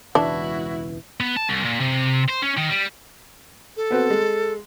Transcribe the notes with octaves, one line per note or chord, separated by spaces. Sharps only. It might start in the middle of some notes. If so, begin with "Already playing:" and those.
E1 C#2 E3 D4 E4 F#4
B3
A5
C2
A#2
C3
C5
C#4
D#3
G3
A4
B3 C4 F#4
G#3